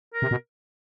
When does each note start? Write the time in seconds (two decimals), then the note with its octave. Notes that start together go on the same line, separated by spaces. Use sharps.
0.14 A#4
0.22 C3
0.31 B2